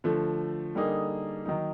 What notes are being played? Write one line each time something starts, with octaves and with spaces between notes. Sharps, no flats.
D3 F3 A3
D3 G3 A#3 D#4 G#4
D#3 F#3 A#3 D#4